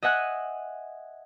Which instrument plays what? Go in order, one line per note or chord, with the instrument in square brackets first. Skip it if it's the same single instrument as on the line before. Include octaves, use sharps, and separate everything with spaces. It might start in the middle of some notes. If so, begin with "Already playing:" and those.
[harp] D#5 E5 F#5 G#5 F#6